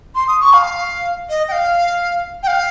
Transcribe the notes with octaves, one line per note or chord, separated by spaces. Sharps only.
C6
D#6
C#6
F5
D#5
G5
F5
G5
F5